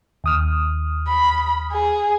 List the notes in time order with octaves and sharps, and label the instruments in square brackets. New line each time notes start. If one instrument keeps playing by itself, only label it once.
[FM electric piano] D#2 D#6 F6
[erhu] B5
G#4